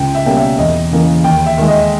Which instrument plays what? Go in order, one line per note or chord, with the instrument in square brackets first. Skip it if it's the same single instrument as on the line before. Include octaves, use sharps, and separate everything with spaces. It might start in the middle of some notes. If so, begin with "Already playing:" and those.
Already playing: [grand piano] C#2 G5
E5
B2 G3 A#3 C#4 G5
E5
E2 D#5
C#3 E3 A#3
D#2 G5
E5
D#3 G#3
D#5